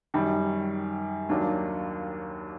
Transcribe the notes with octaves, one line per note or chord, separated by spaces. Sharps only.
F#2 D#3 G3
D#2 D#3 F#3 A#3 D4